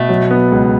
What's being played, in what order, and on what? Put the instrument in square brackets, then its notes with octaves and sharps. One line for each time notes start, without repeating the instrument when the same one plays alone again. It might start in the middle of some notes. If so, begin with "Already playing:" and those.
Already playing: [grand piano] B2 [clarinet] A3
[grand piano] F#3
B3
C#2